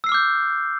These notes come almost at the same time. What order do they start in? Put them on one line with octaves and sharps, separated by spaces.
E6 C7 F6 D6 G6